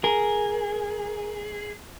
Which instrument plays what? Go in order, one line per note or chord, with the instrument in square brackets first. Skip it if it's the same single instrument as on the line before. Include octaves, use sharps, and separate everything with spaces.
[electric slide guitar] G#4 [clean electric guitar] A#4